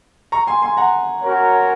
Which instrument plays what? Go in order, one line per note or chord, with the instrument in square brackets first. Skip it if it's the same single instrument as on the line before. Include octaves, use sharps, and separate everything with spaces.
[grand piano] A#5 C#6
G#5 C6
G#5 C6
F#5 A#5
[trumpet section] C#4 F#4 A#4 C#5